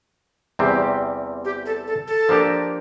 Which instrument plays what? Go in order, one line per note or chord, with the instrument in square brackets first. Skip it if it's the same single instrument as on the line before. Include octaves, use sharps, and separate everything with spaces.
[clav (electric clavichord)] E2 C3 G3 C4 [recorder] G4
[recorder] G4
A4
A4
A4
[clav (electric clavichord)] F3 A#3 D4 G4 A#4